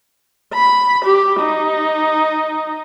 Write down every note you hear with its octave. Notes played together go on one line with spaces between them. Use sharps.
B5
G4
D#4